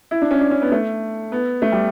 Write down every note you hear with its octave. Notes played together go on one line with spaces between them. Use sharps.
E4
D4
C#4
D4
C#4
B3
A3
B3
A3
G3